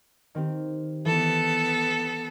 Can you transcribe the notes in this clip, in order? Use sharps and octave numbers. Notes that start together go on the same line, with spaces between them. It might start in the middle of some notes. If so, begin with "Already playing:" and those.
D#3 C4 G4
E3 B3 A4